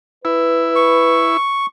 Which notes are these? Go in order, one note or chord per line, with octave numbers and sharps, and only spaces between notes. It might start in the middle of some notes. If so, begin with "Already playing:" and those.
E4 B4
C#6